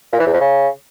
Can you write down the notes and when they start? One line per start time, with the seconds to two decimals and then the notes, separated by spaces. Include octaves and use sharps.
0.13 A#2
0.20 E3
0.26 E2
0.33 F2
0.40 C#3